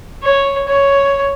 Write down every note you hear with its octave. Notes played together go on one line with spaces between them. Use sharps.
C#5
C#5